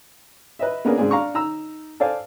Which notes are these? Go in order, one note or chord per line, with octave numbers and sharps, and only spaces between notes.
B4 D#5 E5
A#3 B3 C#4 D4 G#4 A#4
G#2 C#3 C4 D4 G#4
D4 F5 A#5 C#6
D#4 A#5 E6
A4 C5 D5 F5 G#5